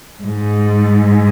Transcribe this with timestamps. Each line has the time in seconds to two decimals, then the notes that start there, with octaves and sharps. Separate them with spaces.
0.23 G#2